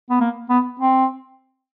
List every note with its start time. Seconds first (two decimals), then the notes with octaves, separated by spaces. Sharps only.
0.10 B3
0.20 A#3
0.50 B3
0.79 C4